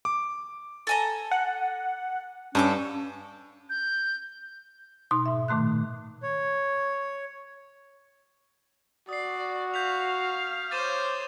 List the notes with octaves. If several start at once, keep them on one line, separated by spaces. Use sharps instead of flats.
D6
A4 G#5 A#5
F#5
G2 C#4 A4 A#5 D6
G6
B2 D#4 C6
G#2 E5
A#2 D#3 A3 C6 F#6
C#5
F#4 D5 D#6 C7
F5 G6 B6 F7
C5 C#5 D6 A6 D#7 E7